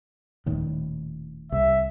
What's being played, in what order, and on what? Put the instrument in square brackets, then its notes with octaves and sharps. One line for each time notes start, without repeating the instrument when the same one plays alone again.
[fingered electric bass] D#1 A2 D#3
[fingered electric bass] C2 [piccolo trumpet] E5